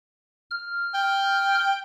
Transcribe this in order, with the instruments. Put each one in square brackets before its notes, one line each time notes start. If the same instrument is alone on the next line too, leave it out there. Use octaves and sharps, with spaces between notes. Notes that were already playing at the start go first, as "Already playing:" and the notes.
[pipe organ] F6
[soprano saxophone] G5